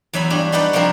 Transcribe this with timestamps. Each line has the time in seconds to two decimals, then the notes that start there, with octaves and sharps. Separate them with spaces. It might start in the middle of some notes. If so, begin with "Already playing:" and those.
0.13 E2 F#3 E5 G#5 B5
0.30 G2 D4 F#4
0.52 G3 D#4 F#4 B4 D5 F#5
0.73 C3 F3 A#3 C4 D4 A#4